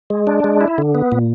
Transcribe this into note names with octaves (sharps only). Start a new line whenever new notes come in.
G#3
D4
G#3
E4
D3
B3
A#2